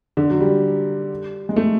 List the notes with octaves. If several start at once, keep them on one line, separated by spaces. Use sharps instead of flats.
D3
F#3
G3
G#3
A3